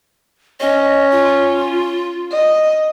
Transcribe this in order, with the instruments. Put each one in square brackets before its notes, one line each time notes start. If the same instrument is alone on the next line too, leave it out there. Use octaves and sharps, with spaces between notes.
[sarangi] C#4 [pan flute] D#5
[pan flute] F4
[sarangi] D#5